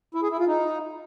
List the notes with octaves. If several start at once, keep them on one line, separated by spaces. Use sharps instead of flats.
E4
G#4
E4
F4
D#4